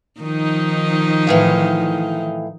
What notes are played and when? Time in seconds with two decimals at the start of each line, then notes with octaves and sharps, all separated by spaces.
0.21 D#3 F3 D#4
1.27 A2 E3 F5